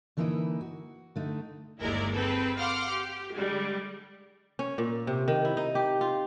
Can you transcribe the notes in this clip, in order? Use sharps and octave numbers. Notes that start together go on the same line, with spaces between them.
D3 E3 A#3 D#4 E4 B4
F#4
D3 A3 D#4
G1 D#2 G#3 E4 A#4 D5
C4 G#4 A4 B4
F5 F#5 C6 D6 F6 C7
G4
D3 G3 G#3
C#4
A#2
C3
D#3
E4
D#4
G4
F4